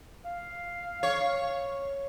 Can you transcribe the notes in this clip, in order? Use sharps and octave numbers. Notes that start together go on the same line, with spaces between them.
F5
C#5